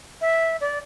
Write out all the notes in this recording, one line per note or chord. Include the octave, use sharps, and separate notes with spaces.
E5
D5